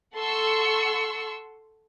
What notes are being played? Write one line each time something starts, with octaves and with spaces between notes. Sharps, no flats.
A4 F#5 C6 C#6 E6